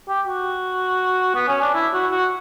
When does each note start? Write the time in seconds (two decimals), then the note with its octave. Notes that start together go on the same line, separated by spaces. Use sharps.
0.08 G4
0.27 F#4
1.35 B3
1.48 C#4
1.62 D4
1.74 E4
1.93 F#4
2.12 F#4